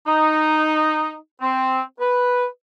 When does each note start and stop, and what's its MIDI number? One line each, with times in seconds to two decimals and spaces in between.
0.06 1.14 63
1.41 1.80 60
2.00 2.45 71